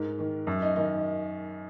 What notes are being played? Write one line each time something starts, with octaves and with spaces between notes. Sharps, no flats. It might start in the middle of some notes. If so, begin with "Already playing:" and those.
Already playing: G#2 A#4
D#3
F#2
D#4
D#3 D#4